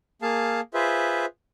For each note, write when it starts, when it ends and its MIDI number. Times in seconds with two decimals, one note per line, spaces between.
0.22 0.61 58
0.22 0.61 68
0.22 0.61 77
0.22 0.61 81
0.74 1.25 65
0.74 1.25 68
0.74 1.25 71
0.74 1.25 72
0.74 1.25 76